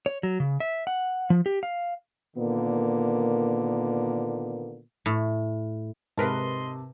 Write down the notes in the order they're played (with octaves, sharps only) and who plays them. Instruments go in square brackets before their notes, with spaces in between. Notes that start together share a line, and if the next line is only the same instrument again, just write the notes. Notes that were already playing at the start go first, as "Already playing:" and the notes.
[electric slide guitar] C#5
F#3
C#3
E5
F#5
F3
G4
F5
[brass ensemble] A#2 D3 D#3 A#3 B3
[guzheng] A2
[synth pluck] G#2 A#4 B4 [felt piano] C3 A5 [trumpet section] D#5 C6